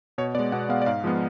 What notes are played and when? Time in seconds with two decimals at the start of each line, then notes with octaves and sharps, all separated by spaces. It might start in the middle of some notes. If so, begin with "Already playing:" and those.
0.18 B2 C#5
0.35 G#3 B3 D5
0.52 B2 F#5
0.69 G#3 B3 F5
0.82 D5
0.86 G#2 F5
1.04 F3 G#3 B3